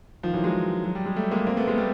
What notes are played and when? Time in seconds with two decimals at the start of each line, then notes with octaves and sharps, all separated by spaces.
0.23 D#3 F3
0.34 E3 F#3
0.44 F#3 G#3
0.84 F#3
0.95 G3
1.06 G#3
1.16 G3 A3
1.31 G#3 A#3
1.47 A#3 C4
1.57 A3 B3
1.67 G#3 A#3
1.78 G3 A3